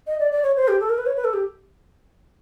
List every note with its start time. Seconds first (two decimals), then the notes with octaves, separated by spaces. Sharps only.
0.07 D#5
0.20 D5
0.32 D5
0.43 C#5
0.56 C5
0.68 G4
0.80 A4
0.89 A#4
0.98 B4
1.06 C#5
1.16 B4
1.24 A4
1.34 G4